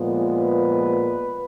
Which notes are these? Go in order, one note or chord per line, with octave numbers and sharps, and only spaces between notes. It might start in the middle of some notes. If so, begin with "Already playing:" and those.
Already playing: A#2 F3 G#3 B3
B4